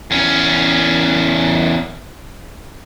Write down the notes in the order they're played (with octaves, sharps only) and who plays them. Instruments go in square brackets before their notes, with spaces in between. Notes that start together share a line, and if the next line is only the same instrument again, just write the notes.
[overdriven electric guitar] E2 C#4